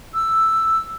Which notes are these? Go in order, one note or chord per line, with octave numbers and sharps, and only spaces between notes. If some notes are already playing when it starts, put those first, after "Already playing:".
E6